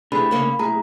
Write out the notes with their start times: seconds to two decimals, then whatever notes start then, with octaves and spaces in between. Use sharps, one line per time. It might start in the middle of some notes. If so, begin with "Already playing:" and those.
0.12 E3 G3 A3 D4 G#4 B5
0.31 C#3 A#3 C#4
0.59 B1 A2 G#4 A#5